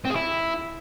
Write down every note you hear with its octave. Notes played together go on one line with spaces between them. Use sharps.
C4
G#4
E4